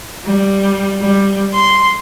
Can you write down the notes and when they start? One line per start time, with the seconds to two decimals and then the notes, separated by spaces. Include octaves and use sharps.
0.24 G3
1.01 G3
1.54 C6